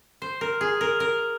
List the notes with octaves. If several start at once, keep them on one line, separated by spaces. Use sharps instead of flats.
C5
A#4
G#4
A#4
A#4